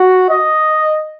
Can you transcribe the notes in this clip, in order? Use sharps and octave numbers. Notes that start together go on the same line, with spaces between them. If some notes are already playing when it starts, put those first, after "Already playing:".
Already playing: F#4
D#5